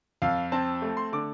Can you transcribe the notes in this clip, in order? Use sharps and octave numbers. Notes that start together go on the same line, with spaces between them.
F2 F5
C4 A5
A3
C6
D3 D6